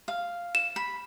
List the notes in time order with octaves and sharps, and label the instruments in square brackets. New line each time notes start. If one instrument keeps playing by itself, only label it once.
[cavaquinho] F5
[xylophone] E7
[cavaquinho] B5